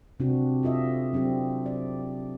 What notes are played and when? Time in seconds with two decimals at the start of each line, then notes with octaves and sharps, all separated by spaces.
0.20 C3 C4 D4 F#4
0.63 F4 A4 D#5 E5
1.13 F#3 C4 D4 G4
1.66 D5